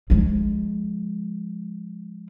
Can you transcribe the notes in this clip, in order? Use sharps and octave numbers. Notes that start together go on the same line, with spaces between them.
F3 G#3